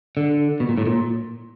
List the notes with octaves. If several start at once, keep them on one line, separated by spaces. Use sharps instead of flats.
D3
B2
A#2
A2
A#2